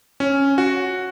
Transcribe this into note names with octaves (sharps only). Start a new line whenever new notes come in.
C#4
F#4